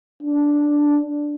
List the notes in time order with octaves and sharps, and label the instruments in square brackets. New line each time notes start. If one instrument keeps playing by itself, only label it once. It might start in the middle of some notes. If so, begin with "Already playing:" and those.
[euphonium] D4